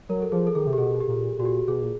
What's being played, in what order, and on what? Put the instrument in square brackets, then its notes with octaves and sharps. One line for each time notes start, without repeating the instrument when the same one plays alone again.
[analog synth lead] F#3 [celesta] A#4
[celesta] A4
[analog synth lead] F3 [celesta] G#4
[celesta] A4
[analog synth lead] D#3 [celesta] G#4
[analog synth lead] C3
[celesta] G4
[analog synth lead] B2 [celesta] G#4
[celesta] G4
[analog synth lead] A#2
[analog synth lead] A#2 [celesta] F#4
[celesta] G4
[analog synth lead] B2 [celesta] G#4
[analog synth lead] A#2